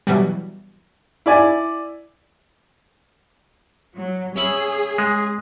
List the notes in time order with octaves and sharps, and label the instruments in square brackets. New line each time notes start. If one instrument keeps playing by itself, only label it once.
[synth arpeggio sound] B2 E3 F#3 G3
[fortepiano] E4 D5 G#5
[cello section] F#3
[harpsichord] C#4 E5 B5 [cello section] G#4
[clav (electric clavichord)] G#3